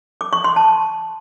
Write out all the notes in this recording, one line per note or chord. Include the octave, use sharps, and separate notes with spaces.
D6
C#6
C6
A5